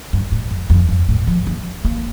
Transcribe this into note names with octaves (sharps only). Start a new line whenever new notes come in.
G2
A2
F2
F2
G2
A2
F3
A#3
A#3